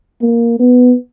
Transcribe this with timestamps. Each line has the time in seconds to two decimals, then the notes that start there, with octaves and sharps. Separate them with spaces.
0.22 A#3
0.60 B3